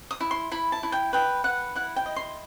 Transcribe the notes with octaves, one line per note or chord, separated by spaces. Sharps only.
D#6
E4
C6
E4 B5
A5
E4
G5
B4 G5
B4 F#5
E4 F#5
G5
D#5
C6